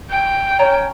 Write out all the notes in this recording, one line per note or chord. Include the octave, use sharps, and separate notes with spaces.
G5
C#4 A5 A#5